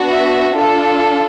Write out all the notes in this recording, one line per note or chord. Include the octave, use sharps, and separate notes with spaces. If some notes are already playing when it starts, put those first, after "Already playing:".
Already playing: B3 D4 F#4
E5
D4 F4 A4